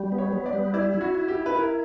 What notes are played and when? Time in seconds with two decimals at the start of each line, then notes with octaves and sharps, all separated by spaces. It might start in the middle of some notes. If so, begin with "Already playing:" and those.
Already playing: G3
0.12 B3
0.18 C#5
0.33 B3
0.46 D5
0.53 G3
0.74 E4 D5
0.94 E4
1.01 F#4
1.15 E4
1.28 G4
1.35 E4
1.46 B4
1.56 E4 A#4